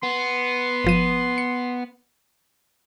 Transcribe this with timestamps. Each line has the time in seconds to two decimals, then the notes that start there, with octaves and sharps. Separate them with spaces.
0.03 B3 C6
0.84 G1 F3 D#7
1.38 C#7